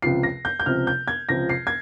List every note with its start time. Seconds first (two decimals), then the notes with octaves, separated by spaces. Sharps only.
0.02 C#2 C3 F3 C7
0.23 A#6
0.45 G6
0.60 G6
0.66 C#2 C3 F3 F6
0.87 G6
1.08 G#6
1.29 C#2 C3 F3 A#6
1.49 C7
1.67 G#6